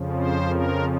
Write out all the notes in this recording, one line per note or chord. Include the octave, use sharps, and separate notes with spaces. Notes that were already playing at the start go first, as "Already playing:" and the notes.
Already playing: F2 C#3 F3
C5
A#4